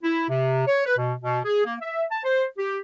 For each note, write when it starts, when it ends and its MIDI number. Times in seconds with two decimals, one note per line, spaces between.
0.03 0.25 64
0.29 0.64 48
0.67 0.83 73
0.85 0.97 71
0.98 1.14 47
1.21 1.40 47
1.45 1.62 68
1.65 1.74 58
1.81 2.03 76
2.11 2.22 81
2.24 2.44 72
2.57 2.78 67